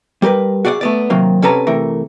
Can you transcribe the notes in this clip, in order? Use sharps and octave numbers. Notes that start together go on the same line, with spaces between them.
G3 G4 A#4 B4
F#4 G#4 D5 D#5 F#5
A3 B3 D5
C3 D#3 F#3 A#3 C4
C3 C#4 A4 B4 D5 A#5
C3 E3 A3 A#4